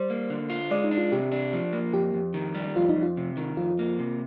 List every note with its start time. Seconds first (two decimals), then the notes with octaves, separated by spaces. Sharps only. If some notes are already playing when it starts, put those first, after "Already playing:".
Already playing: G3 C5
0.10 A#3
0.30 D3
0.50 F4
0.71 G#3 D5
0.84 D#4
0.91 D4
0.98 F4
1.12 C3 G4
1.32 D4
1.53 F3
1.73 A#3
1.93 F2 G4
2.14 F2
2.34 D#3
2.55 G3
2.76 F2 F4
2.89 D#4
2.96 F2
3.02 F4
3.17 C3
3.37 D#3
3.57 F2 F4
3.79 A#3
3.99 C3